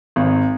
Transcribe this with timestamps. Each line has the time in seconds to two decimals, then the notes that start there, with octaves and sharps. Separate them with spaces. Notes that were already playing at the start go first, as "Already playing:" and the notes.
0.16 G#1